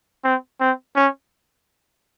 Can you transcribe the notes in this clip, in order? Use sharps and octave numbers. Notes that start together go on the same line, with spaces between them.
C4
C4
C#4